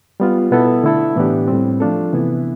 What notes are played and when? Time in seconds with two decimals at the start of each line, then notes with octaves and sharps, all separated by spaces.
0.20 G3 B3 F4
0.51 B2 B3 E4 A4
0.84 D3 A3 E4 A4
1.16 A2 E3 B3 D4 G4
1.48 A2 G3 C4
1.80 F3 A3 D4 F4 A4
2.13 C3 E3 B3 E4